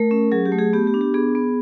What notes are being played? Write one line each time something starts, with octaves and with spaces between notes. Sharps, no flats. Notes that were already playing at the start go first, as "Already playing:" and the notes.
Already playing: A3 A#4
C#4
F#3 G#4
G4
A3
G#4
B3 G4
G4
D4
G4
B3 G#4
B3